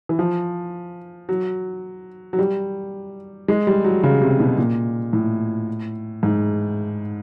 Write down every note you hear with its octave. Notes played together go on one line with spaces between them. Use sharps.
E3
F3
F#3
F#3
G3
G#3
G3
F#3
C#3
C3
B2
A#2
A2
G#2